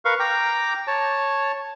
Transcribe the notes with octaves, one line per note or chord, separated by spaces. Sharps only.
A#4 B4 F5 C#6
G5 A#5 D6
C#5 A5